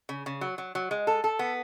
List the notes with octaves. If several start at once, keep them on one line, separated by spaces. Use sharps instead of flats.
C#3
C#3
F#3
F#3
F#3
G#3
A4
A4
B3